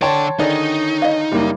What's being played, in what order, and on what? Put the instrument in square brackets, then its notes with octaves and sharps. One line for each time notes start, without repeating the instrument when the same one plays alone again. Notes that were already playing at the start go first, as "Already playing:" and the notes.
[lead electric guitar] D3 D5 [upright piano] C#5 G5 A5 [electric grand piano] C6
[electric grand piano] D3 D#3 [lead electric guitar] D#4 [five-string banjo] G#4 D5
[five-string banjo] D#5 F5
[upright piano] F#1 [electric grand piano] G3 A#3